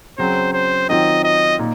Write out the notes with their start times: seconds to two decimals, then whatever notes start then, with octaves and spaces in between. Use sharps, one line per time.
0.18 C#3 F#3 C4 C5
0.53 C5
0.89 D#3 F#3 C4 F4 D#5
1.24 D#5
1.59 A#2 D#4